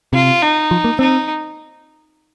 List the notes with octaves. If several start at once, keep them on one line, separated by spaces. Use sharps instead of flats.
C3 F4
D#4
F3
A#3
C4 D#4